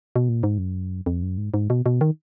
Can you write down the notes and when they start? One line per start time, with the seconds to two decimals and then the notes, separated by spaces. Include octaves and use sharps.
0.16 B2
0.29 A#2
0.43 G#2
0.58 F#2
1.06 F2
1.22 F#2
1.38 G#2
1.54 G#2
1.70 B2
1.86 B2
2.01 D#3